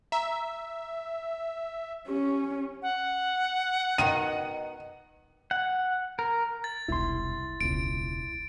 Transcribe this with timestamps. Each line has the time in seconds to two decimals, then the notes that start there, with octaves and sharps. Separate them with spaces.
0.12 E5 A#5
2.08 C#4 G4
2.82 F#5
3.98 B2 D#3 D#7
5.51 F#5
6.19 A#4
6.64 A6
6.88 E1 C2 E4 C6
7.61 E1 C#2 D7